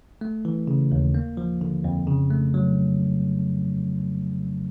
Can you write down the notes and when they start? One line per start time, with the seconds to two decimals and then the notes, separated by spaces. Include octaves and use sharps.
0.21 A3
0.45 E3
0.67 C#3
0.92 D#2
1.15 A#3
1.37 F3
1.61 D3
1.84 F2
2.07 C#3
2.30 A3
2.54 F#3